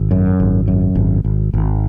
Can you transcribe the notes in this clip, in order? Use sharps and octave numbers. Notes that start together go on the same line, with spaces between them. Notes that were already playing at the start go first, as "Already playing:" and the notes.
Already playing: G#1
F#2
G#1
F#2
G#1
G#1
G#1